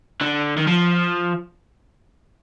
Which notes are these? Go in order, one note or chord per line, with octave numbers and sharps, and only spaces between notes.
D3
D#3
F3